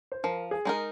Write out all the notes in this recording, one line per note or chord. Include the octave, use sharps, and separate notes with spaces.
C5
F3 A#4
G#4
G#3 D#4 A#4